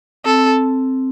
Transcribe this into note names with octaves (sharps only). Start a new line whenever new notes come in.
C4 A4